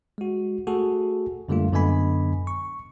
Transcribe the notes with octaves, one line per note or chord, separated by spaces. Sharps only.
G#3 F#4
A3 F#4 G#4 A4
F#2 D3 G3 A3 A#3 F4
F#2 D3 B3 D#5 G#5 B5
C#6